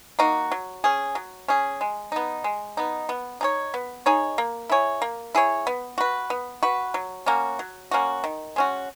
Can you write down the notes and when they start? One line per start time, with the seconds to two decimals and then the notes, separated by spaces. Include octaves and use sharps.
0.19 A#3 D#4 F#4
0.52 F#3
0.84 C#4 G#4
1.15 F#3
1.48 C#4 G#4
1.81 G#3
2.12 B3 D#4
2.44 G#3
2.77 B3 D#4
3.09 B3
3.41 D#4 G#4 C#5
3.74 B3
4.06 D#4 G#4 C#5
4.38 A#3
4.70 E4 G#4 C#5
5.02 A#3
5.35 E4 G#4 C#5
5.67 B3
5.98 F#4 B4
6.30 B3
6.63 F#4 B4
6.94 F#3
7.26 A#3 C#4 F#4
7.59 F#3
7.91 A#3 C#4 F#4
8.24 D#3
8.56 G#3 C#4 F#4